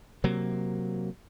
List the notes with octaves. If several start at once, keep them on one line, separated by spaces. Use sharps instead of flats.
C3 F#3 A#3